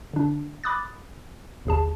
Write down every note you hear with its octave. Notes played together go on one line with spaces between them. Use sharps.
D3 D4
B5 D6 D#6 F#6 A6
G1 D#2 G#4 A5